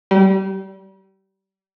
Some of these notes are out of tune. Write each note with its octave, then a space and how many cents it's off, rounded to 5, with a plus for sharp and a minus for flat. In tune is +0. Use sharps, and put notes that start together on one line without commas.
G3 -30